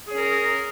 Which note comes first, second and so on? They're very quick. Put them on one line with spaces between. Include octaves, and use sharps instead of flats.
G#4 C#4 A#4